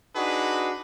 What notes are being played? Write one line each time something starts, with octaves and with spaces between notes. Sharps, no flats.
D4 D#4 F#4 G#4 B4